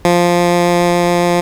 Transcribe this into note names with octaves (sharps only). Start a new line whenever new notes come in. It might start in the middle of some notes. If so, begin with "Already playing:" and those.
F3